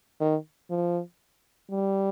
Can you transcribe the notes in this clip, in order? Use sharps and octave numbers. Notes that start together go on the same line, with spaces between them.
D#3
F3
G3